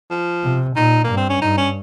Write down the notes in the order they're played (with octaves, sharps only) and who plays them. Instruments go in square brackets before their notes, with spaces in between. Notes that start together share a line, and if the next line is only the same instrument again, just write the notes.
[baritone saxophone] F3
[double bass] C3
[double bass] A#2 [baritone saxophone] D#4
[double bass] G2 [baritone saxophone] A#3
[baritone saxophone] C4
C#4
[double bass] G2 [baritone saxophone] D#4
[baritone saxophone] C#4